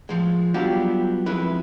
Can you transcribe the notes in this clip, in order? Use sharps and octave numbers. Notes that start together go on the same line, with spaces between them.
A2 F3 G#3
F#3 G3 B3 D4 F4 G4
F2 G#3 E4 B4